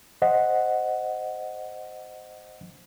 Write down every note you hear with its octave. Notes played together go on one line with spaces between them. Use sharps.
C5 D#5 F#5